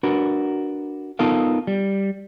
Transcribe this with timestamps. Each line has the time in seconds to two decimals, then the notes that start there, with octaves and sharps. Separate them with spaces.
0.03 D4 F#4 A#4 B4
1.19 B3 D#4 F4 A4 A#4 F5
1.67 G3